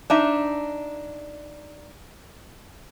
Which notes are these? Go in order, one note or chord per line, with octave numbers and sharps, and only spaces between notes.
D4 D#4 E5